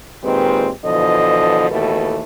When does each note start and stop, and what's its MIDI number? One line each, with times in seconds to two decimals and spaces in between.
0.23 0.70 46
0.23 0.70 51
0.23 0.70 56
0.23 0.70 60
0.23 0.70 67
0.23 0.70 71
0.84 1.67 47
0.84 1.67 50
0.84 1.67 52
0.84 1.67 53
0.84 1.67 69
0.84 1.67 75
1.70 2.22 39
1.70 2.22 47
1.70 2.22 52
1.70 2.22 57
1.70 2.22 69
1.70 2.22 71